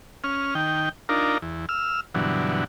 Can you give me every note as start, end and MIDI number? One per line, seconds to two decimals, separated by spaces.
0.24 0.54 61
0.24 0.54 89
0.55 0.89 51
0.55 0.89 79
1.09 1.38 62
1.09 1.38 63
1.09 1.38 65
1.09 1.38 70
1.42 1.66 40
1.69 2.00 88
1.69 2.00 89
2.15 2.64 43
2.15 2.64 47
2.15 2.64 50
2.15 2.64 52
2.15 2.64 54